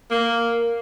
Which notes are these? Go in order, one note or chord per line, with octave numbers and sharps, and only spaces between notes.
A#3